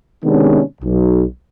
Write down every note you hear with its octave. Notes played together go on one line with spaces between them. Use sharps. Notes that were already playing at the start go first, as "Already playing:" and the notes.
C3 D#3 G#3 B3 C#4 D4
B1